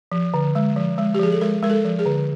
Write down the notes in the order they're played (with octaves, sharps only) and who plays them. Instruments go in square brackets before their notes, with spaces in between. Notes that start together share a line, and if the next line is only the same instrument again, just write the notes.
[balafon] F3
D3
G#3
F3
G#3
G4
F3 G#4
A4
G#3 A#4
G#3 A#4
A4
F3
G#4
D3